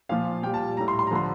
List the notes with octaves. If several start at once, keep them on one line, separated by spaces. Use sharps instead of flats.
A#2 F3 F5
A#2 G3 G5
A5
A2 G3 A#5
C6
C6
A#5
D3 F3 C6